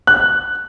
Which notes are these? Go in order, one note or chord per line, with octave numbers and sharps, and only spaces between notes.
F#6